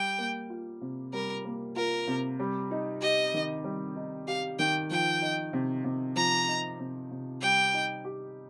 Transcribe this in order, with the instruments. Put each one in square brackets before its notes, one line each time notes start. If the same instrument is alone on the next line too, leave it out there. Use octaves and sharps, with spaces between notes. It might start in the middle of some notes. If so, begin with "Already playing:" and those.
Already playing: [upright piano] G3 [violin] G5
[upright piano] A#3
F4
C3
[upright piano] G3 [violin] A#4
[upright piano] A#3
[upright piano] F4 [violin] A#4
[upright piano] C3
G3
D#4
[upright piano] G4 [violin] D#5
[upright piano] D#3
G3
D#4
[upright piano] G4 [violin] F5
[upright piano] D#3 [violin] G5
[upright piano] F3 [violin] G5
[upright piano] D#4
C3
C3
[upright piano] F3 [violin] A#5
[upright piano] D#4
C3
C3
[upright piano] G3 [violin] G5
[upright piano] D#4
G4